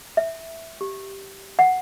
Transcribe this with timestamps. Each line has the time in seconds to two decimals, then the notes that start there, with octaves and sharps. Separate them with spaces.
0.17 E5
0.81 G4
1.59 F#5